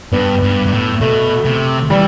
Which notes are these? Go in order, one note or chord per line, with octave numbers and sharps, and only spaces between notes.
G2 B3
G2
G2
A2
B2 A3
C3
E3 G3